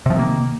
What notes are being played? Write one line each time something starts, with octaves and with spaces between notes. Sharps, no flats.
C3 D#3 F3 A#3